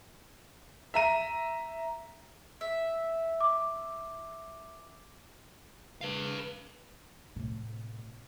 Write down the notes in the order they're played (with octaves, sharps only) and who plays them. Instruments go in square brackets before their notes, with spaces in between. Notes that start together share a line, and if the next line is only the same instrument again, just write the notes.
[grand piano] E5 A#5 D#7
[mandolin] E5
[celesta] D6
[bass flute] C#3 [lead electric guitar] B4 F5
[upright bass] A2 C3